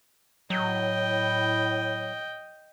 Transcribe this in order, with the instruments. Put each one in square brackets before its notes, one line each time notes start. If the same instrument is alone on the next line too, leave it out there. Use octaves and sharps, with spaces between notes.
[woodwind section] A2 [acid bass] F#3 [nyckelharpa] D#5 G5